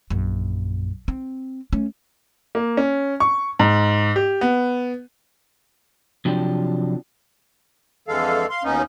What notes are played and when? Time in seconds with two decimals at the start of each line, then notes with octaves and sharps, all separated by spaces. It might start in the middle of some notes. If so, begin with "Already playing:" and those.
0.10 A#1 F#2
1.08 C4
1.72 A3 C#4
2.55 A#3
2.77 C#4
3.20 C#6
3.59 G#2
4.16 G4
4.41 B3
6.25 C3 F3 F#3 D4 G4
8.08 F2 D3 E3 G#3 A4 F5
8.50 F5 C6
8.64 D#2 B2 B3 C#4 D#4